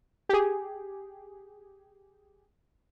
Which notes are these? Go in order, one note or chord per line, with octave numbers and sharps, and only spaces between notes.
G4 G#4